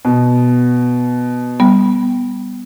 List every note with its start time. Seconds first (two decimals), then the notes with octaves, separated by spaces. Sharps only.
0.05 B2
1.60 G3 B3